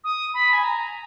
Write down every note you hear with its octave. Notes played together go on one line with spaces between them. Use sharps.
D#6
B5
G#5
A#5